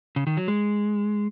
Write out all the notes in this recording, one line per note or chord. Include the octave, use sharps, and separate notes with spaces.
C#3
D#3
F#3
G#3